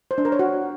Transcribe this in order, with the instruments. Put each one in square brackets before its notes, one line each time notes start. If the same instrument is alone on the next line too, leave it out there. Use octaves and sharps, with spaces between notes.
[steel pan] C5
D4
A#4
C#5
F#4